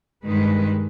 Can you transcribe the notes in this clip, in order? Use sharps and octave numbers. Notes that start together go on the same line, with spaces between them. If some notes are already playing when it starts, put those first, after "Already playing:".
G2 D#3 G#3 B4